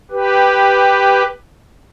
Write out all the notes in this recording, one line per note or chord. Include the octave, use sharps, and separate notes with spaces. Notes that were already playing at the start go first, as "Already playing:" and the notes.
G4 B4